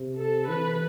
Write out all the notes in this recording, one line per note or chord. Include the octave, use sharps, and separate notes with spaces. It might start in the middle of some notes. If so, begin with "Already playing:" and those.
Already playing: C3
A4
E3 B4